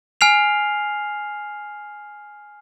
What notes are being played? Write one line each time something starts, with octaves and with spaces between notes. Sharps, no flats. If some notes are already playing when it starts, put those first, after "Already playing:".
G#5 F6 C7 F7